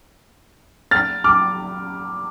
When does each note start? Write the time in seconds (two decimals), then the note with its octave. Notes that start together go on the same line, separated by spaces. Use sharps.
0.91 F6 A6
1.24 D6 F6